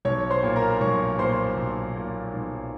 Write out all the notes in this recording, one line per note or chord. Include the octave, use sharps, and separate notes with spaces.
B1 C#5 C#6
C5 C6
A#2
A#4 A#5
B1 C#5 C#6
A#2 C5 C6
B1
A#2
B1